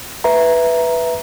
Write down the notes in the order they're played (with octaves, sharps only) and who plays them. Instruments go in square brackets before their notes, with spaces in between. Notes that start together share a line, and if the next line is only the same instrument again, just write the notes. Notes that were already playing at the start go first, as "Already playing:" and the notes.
[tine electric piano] B4 E5 A#5